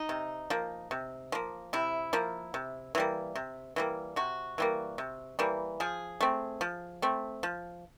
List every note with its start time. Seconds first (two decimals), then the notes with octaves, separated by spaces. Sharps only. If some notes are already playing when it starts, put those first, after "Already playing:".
Already playing: D#4
0.09 C3
0.50 F3 A#3
0.91 C3
1.32 F3 A#3
1.73 C3 E4
2.13 F3 A#3
2.54 C3
2.95 E3 G3 A#3
3.35 C3
3.76 E3 G3 A#3
4.16 C3 F#4
4.58 E3 G3 A#3
4.98 C3
5.39 E3 G3 A#3
5.80 F3 G#4
6.20 A3 C4
6.61 F3
7.02 A3 C4
7.43 F3